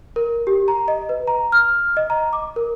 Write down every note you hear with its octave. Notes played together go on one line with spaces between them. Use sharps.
A#4
G4
A#5
D#5
B4
A#5
F6
D#5
A#5
D6
A#4